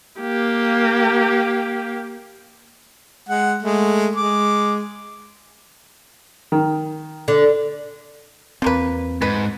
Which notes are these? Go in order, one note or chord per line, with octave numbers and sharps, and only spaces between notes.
A#3 G4
G#3 F#5
G#3 A3
G#3 D6
D#3
D3
E2 F3 A#3 C4 B4
G#2 B4